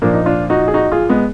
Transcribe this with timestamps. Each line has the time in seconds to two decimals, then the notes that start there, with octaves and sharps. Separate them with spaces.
0.02 A#2 F3 A#3 D4
0.14 D#4
0.26 D4 F4
0.50 D#4 F#4
0.68 G#4
0.74 D#4 F#4
0.92 F4 G#4
1.09 G#3 B3